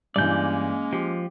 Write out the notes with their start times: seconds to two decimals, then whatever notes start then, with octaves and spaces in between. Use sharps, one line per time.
0.16 G2 E3 G#3 A#3 C#4 D5 G6
0.93 F3 G4